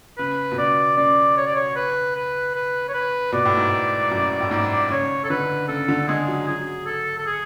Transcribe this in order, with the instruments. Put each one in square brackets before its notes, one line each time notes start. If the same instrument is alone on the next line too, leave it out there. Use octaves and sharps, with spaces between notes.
[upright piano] C#3 [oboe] B4
[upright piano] B2
[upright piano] C#3 [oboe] D5
[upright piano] C#3 [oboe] D5
[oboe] C#5
D5
C#5
B4
B4
B4
C#5
B4
[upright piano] B2 [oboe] D5
[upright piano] A2
G#2
A2
F#2
A2
G#2
[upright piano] C#3 [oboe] C#5
[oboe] A4
[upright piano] D3 [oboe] B4
[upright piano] C#3 [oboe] A4
[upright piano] D3
[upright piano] G#3 [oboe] G#4
[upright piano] F#3
[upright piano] F#3 [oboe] G#4
[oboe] A4
A4
G#4